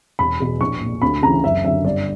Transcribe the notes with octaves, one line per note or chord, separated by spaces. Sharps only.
E1 B5
E2 B2
A#1 C#6
A#2
D2 B5
C#3 E3 A#5
F#1 E5
F#2 D3 E5
G1 D5